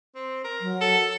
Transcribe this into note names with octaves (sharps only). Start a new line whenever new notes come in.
C4
A#4
F#3
A4